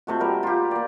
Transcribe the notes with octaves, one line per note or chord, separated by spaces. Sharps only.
C3 A3 F#4
G3 A#4
F4 G4
A#3 D5